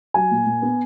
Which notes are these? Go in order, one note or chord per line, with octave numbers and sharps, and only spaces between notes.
F#3 G#5
A#2
A#2
B3